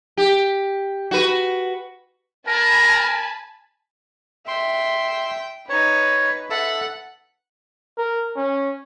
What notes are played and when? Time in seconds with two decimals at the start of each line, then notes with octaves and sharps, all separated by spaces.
0.17 G4
1.11 F#4 B4
2.48 A#4 G#5 A5 B5
4.48 E5 G5 C6
5.69 D#4 B4 C#5
6.50 A4 E5 F#5
7.98 A#4
8.36 C#4